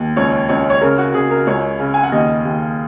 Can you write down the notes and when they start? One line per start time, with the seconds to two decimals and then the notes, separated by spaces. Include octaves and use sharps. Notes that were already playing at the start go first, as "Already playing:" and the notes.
Already playing: D#2
0.17 C#2 C#5
0.49 C#2 C#5
0.70 C#5
0.81 C#3 A#4
0.98 F#4
1.14 C#3 G#4
1.31 A#4
1.47 C#2 C#5
1.79 C#3
1.94 G#5
2.03 F#5
2.12 D#2 D#5
2.45 D#2